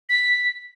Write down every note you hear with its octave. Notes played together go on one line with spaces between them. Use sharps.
B6